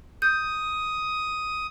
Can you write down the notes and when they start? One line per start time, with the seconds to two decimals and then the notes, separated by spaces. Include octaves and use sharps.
0.22 D#6 G6